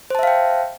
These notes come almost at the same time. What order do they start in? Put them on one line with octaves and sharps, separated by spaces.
C5 A5 E5 F5 G5